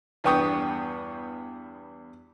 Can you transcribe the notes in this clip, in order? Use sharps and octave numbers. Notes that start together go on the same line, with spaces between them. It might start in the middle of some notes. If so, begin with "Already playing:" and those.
E2 G2 B3 G5 C#6 D#6